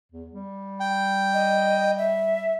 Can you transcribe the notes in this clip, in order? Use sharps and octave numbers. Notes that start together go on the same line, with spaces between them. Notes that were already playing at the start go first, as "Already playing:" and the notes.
E2
G3
G5
D#5
E5